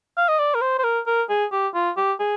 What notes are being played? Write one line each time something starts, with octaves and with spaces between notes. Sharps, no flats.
F5
D#5
D5
A#4
C5
C5
A#4
A#4
G#4
G4
F4
G4
G#4